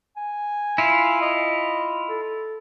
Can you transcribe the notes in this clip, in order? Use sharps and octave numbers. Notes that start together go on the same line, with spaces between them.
G#5
E4 F4
D#5
A4